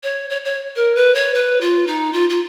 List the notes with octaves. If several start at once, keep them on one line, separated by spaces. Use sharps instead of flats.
C#5
C#5
C#5
A#4
B4
C#5
B4
F4
D#4
F4
F4